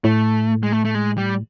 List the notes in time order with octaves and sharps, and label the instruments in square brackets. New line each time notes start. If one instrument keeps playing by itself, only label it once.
[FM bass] A2 [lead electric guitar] A3
[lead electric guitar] G#3
A3
A3
G#3
G3